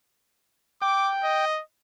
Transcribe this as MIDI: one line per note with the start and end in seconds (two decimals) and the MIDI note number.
0.82 1.45 79
0.82 1.12 86
1.24 1.61 75